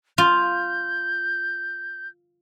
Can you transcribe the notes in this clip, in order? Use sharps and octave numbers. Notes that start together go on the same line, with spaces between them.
F4 G6